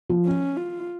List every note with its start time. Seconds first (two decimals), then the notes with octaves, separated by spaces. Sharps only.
0.10 F3
0.25 C#4
0.57 F4